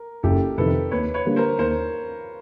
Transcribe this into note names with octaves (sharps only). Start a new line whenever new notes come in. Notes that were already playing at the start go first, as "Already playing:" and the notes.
Already playing: A#4
F#1 G4 A4
F2 C3 D#3 A4 B4
D#2 B4 C#5
B4 C#5
D3 G3 A#3
A#4 C5
D#2 A#4 C5